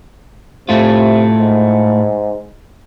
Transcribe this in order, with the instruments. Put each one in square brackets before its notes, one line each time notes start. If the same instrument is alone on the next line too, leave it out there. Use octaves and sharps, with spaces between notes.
[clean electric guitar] A2 A3 F4 [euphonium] C3
[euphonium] G#2